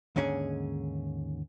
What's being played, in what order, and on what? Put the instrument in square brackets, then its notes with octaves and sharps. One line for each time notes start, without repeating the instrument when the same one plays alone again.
[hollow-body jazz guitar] D#2 G#2 D3 C#4 G#4 G#5